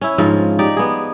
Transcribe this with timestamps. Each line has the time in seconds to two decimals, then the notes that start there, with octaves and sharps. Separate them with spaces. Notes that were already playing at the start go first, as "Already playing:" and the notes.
0.01 C#4 E4
0.18 G#2 F3 F4
0.59 D#4 G4 D5
0.77 B3 G#4